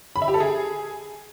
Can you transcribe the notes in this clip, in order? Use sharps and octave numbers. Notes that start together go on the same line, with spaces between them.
B5
E5
G4
A4
G#4